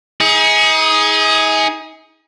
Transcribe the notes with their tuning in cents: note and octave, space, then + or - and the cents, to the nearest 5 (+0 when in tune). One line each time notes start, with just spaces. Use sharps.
D#4 +40 G#4 +0